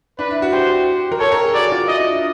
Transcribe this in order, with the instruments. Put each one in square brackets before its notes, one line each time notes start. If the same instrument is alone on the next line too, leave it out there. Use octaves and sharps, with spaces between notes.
[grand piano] D4 [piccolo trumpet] B4
[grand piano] E4
F#4
[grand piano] G4 [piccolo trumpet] C5
[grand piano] A#4
[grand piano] A4 [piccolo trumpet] C#5
[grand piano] A#4
G#4
[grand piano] F#4 [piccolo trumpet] D5
[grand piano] F4
[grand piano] E4 [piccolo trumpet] D#5
[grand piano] D4
E4